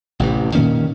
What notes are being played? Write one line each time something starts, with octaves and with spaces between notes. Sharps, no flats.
A1 C3 E3
A#2 D#3 A#3 C#4